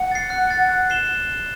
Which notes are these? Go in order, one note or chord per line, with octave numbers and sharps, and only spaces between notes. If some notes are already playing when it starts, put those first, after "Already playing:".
Already playing: F#5
A6 C7
F#6
A6 C7
F#6
C7 E7 G7